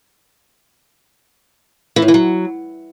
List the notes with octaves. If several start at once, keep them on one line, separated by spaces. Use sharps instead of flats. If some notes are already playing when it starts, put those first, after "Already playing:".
E3
A2
E3
F#3